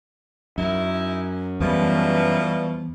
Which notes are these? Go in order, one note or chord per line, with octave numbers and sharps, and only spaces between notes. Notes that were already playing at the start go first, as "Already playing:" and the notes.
F#2 D#4 E4
E2 B2 E3 F3 G3